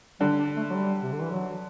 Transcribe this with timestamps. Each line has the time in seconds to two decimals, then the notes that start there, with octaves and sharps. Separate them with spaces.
0.20 D3 G3
0.39 D4
0.56 A3
0.70 F#3
0.75 G3
1.03 C3
1.12 D3
1.21 E3
1.31 F#3